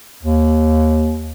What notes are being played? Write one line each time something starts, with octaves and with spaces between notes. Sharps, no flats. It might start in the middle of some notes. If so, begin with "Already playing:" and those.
D#2